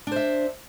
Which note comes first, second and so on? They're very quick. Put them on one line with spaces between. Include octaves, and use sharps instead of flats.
D4 C5 E5